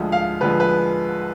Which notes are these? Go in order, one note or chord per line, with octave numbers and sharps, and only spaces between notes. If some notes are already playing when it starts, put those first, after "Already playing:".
Already playing: D2 D3 F3 G#3
F5
D2 D3 F3 G#3 B4
B4